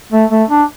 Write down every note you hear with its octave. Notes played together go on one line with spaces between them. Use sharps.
A3
A3
D4